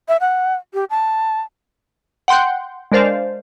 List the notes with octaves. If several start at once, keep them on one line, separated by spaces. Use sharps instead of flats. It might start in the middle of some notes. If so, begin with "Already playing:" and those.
E5
F#5
G4
A5
F#5 G5 C6 F#6 G6
G#3 D4 A#4 C5 D5 F5